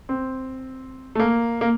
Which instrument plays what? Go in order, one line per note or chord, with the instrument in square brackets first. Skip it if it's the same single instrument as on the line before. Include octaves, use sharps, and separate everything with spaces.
[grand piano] C4
A3
A#3
A#3